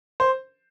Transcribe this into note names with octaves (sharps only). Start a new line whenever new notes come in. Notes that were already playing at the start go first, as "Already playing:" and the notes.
C5